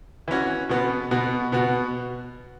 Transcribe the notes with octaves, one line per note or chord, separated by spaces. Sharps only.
E3 C#4 F#4
B2 B3 F#4
B2 B3 F#4
B2 B3 F#4